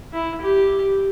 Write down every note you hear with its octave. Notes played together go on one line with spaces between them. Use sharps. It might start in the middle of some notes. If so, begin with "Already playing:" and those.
E4
G4